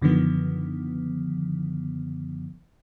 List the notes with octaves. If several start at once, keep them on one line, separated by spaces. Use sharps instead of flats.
F#2 D3 D#3 F3 B3